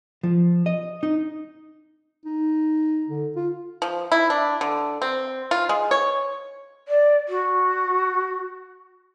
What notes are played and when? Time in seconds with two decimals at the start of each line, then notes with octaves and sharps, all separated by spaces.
0.23 F3
0.66 D#5
1.03 D#4
2.26 D#4
3.08 D3
3.36 F4
3.82 F3
4.12 E4
4.30 D4
4.61 D3
5.02 C4
5.51 F4
5.69 G#3
5.91 C#5
6.88 D5
7.28 F#4